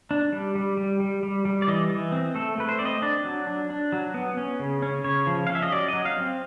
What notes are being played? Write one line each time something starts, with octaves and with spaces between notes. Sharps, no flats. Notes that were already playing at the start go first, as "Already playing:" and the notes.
D4
G3
G3
G3
G3
G3
G3
D5
E3 D#5
E3
C4
A3 A4
A3 B4
C5
C4 D5
D#5
D4 D5
F#3
D4
D4
F#3
B3
C#4
C#3
C#4
C#3 C#5
F3
F5
C#4
E5
D#5
F#3 D5
F#3 D#5
F5
C4